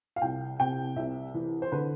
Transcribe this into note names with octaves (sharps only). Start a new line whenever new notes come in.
F5
C2 G5
C3 G5
C2 E5
E3
C5
D3 B4